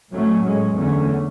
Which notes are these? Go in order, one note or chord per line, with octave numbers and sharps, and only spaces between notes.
A2 F#3 A3 C#4
A2 G#3 C#4
E2 D3 A3 C#4